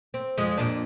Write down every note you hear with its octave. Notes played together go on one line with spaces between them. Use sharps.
C4
F2 G#3
F2 A#2 D4